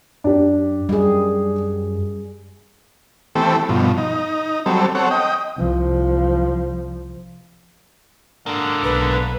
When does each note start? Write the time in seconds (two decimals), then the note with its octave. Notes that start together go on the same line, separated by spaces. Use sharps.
0.24 F#2 D4 G4
0.89 F#2 G3 G#4
3.35 E3 A3 C4 G4 A4
3.69 G2 B2 F3
3.98 D#4
4.66 F#3 G3 C4 A4
4.95 C4 A4 C#5 F#5
5.11 D#5 G5
5.58 C2 F3
8.46 G#2 D3 A#3
8.84 B1 B4